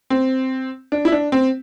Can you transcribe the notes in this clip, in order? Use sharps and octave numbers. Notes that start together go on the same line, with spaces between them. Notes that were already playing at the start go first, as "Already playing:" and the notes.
C4
D4
E4
D4
C4